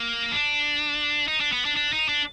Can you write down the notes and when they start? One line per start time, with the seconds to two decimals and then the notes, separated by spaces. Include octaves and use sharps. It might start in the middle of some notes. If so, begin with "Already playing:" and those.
Already playing: A#3
0.32 D4
1.28 D#4
1.40 D4
1.52 B3
1.65 D4
1.76 D4
1.93 D#4
2.09 D4